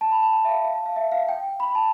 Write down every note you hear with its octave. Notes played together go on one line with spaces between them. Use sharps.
A5
B5
A5
G5
E5
F5
F5
A5
F5
E5
F5
G5
B5
A5